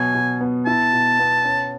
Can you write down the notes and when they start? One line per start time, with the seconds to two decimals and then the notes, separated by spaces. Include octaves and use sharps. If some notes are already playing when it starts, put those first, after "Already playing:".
Already playing: B2 F#3 G#5
0.14 B2
0.41 B3
0.66 E4 A5
0.93 B2
1.20 B3
1.45 C#4